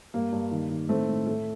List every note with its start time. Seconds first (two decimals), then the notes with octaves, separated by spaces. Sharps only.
0.14 G2 A#3
0.32 G2
0.51 D#3
0.70 D#3
0.89 A2 A3 C4
1.08 A2
1.26 A2 A3